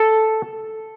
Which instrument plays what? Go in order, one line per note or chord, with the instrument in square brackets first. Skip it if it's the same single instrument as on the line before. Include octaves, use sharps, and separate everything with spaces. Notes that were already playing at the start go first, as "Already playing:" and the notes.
Already playing: [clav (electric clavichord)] A4